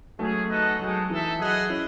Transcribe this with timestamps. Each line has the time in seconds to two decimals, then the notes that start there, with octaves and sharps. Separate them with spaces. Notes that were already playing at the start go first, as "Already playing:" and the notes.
0.19 F#3 G#3 A3 C#4 G#4
0.48 B3 D#4 A4 D#5 F#5
0.79 F#3 G#3 D#4 A4
1.10 E3 D#4 A4 E5
1.39 F#3 E4 G#4 D#5 F#5
1.70 C#4 E4